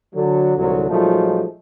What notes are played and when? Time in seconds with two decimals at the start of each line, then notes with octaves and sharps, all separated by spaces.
0.13 D3 F#3
0.57 C2 G#2 D3 E3 F#3
0.88 A#2 F3 F#3 G#3 A3 D#4